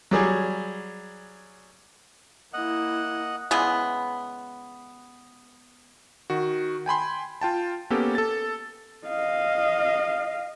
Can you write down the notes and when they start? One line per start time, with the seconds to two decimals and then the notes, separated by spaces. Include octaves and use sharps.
0.11 F#3 G3 G#4
2.53 A#3 E4 D#5 F#5
3.51 C#3 E3 G#3 B3
6.30 D#3 F#4
6.86 G5 G#5 B5 C6
7.41 F4 G5 A5
7.90 A#3 B3 C#4 G4 A4
8.15 A4 A6
9.07 D#5 F5